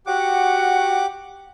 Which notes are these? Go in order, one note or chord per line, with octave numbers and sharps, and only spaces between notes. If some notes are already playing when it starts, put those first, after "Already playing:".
F#4 G4 F#5 D6